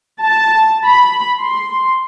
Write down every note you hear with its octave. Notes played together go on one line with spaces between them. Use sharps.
A5
B5
C6